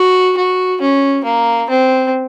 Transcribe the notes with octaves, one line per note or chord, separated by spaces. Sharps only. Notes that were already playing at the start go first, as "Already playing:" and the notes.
Already playing: F#4
F#4
C#4
A#3
C4